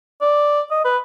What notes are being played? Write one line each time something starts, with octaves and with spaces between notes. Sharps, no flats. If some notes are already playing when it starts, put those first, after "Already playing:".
D5
D#5
B4